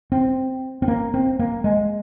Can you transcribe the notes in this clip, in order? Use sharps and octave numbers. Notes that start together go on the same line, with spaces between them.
C4
C4
A#3
C4
A#3
G#3